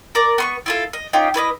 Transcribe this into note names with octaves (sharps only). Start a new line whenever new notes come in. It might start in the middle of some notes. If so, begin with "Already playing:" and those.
A#4 D5
B3 C6 C#6
E4 F4 A4
D#5
C#4 D#4 F4 G4
E4 B4 D5 D#5